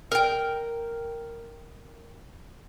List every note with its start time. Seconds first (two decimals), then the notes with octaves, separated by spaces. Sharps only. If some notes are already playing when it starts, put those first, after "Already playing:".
0.12 A#4 G5